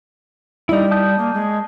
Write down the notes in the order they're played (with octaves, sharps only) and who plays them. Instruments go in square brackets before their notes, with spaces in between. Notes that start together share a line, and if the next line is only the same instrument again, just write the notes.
[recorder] G3 [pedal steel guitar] D#4 E4
[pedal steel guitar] A5 D#6 G6
[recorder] A#3
G#3